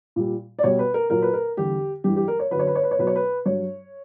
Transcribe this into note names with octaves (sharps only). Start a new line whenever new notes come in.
A#2 G3
D5
B2 G3 C#5
B4
A#4
A#2 F#3 A#4
B4
A#4
E2 D3 G3 G4
G2 E3 G3 G4
G4
A#4
C#5
F#2 D3 F#3 B4
C#5
B4
C#5
B4
C#5
B2 F#3 B4
C#5
B4
G2 F#3 C#5